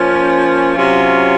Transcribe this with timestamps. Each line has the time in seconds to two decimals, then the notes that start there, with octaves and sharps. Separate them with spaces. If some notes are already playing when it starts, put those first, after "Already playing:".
Already playing: F3 A#3 C#4
0.74 C3 F#3 C#4 F4